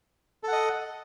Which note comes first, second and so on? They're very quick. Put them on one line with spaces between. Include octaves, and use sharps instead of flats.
A4 F#5 D#5